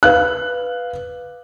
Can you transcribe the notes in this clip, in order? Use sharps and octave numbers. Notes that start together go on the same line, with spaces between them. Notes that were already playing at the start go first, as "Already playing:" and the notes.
B4 F5 F#6